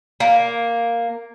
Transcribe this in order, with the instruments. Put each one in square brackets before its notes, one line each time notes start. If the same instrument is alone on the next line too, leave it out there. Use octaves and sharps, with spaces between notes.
[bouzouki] A#3